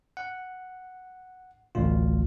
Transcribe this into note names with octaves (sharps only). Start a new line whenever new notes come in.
F#5
A1 D2 F4